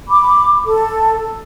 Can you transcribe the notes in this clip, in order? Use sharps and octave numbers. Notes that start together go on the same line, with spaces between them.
B5 D6
A4